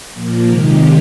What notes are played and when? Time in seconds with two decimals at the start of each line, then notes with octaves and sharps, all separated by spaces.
0.13 A#2 F3 A#3
0.46 C3 D#3 G#3 D#4 G4